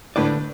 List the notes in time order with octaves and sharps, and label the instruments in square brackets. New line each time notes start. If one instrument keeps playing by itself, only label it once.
[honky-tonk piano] A2 [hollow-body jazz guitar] D3 A3 D4 B4 D5